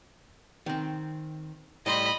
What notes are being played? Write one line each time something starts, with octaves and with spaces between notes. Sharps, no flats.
D#3 C4
A2 G3 D#5 B5 C6